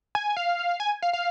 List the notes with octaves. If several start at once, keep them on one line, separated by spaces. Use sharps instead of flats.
G#5
F5
G#5
F5
F5